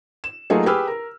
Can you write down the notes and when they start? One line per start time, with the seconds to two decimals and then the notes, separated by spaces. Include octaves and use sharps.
0.24 E7
0.50 F#3 A3 A#3 D#4 F4 G#4
0.66 G4 G#4 B4 B5 E6 F6
0.87 A#4